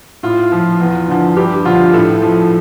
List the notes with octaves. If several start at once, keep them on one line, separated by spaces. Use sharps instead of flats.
A2 F4
F3
E2
D3 F3
G2 G4
D3 F3 F4
A2 A4
F3